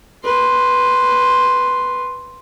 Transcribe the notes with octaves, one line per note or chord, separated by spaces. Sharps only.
B4 C6